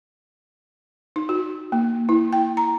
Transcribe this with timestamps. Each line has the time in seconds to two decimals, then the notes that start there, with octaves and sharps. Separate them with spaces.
1.16 D#4
1.29 F#4
1.72 A#3
2.09 E4
2.33 G5
2.57 A#5